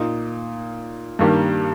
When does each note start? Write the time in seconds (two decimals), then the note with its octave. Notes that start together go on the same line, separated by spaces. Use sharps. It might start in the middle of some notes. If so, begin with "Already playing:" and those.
Already playing: A#2 A#3 D#4
1.19 G2 D#3 G3 A#3 G4